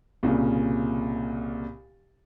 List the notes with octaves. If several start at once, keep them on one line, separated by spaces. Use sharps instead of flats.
C2 A#2 C#3